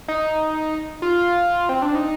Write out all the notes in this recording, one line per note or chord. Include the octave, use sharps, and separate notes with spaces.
D#4
F4
C4
D4
D#4